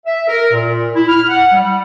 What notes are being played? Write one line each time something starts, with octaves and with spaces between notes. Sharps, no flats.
E5
A#4
A#2
E4
F6
F#5
G3